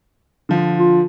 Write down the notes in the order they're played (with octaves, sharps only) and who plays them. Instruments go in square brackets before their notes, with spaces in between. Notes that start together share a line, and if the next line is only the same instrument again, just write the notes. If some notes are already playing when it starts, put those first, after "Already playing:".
[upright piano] D3 F3
[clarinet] F4